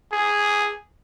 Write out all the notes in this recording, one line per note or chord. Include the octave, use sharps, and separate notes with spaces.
G#4